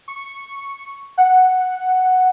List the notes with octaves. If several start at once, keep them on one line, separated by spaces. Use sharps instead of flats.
C#6
F#5